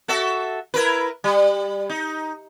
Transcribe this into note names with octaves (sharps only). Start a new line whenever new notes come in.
F#4 A4 E5
E4 A#4 B4
G3
D#4